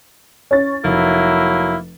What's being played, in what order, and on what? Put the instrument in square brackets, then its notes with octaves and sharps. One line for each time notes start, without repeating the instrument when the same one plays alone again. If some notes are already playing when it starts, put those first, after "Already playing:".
[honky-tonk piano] C#4 A6
[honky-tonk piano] F1 [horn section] F#3 A#3 E4